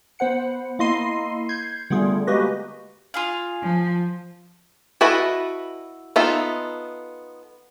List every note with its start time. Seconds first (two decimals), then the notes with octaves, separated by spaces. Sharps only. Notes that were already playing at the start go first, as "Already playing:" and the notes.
0.19 B3 C5 F#5 C#7
0.79 A#3 E4 D#5 C6 C7 D#7
1.49 G6 G#6 C7
1.90 D3 G3 A3 B3 F4 G#4
2.27 G#3 A#3 F#4 G4 B4 D#5
3.14 F4 G#4 F5
3.62 F3
5.01 E4 F#4 A4 B4 D#5
6.16 B3 D#4 F4 A4 E5